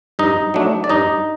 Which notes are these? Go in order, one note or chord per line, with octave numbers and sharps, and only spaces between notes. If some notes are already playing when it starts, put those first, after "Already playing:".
G2 D#4 D#5
F#3 A3 D4
D5
G2 D#4 D#5